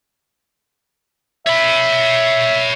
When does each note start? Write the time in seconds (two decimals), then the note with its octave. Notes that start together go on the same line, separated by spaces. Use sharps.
1.46 C#5 E5 B5